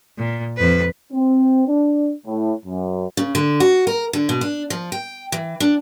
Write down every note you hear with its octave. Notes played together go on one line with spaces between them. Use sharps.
A#2
F2 B4
C4
D4
A2
F#2
C#3
D3
F#4
A#4
D3
B2
D4
F3
G5
E3
D4